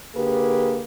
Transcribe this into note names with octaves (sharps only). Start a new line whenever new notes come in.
D3 A#3 G4 G#4 B4